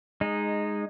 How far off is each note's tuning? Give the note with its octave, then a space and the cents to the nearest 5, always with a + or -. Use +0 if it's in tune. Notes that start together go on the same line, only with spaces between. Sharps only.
G#3 -5 D#4 -10